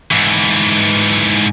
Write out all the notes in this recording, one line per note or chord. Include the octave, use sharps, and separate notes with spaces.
G#2 E3